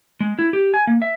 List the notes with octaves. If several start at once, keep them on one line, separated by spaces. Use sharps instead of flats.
G#3
E4
G4
G#5
A#3
E5